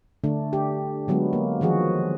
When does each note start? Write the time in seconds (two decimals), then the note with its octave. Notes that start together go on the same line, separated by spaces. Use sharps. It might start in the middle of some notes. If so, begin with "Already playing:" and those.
0.24 D3 A3 D4
0.53 G4
1.08 D3 F#3 G#3 B3
1.33 A#3
1.61 D#3 F3 F#4 G#4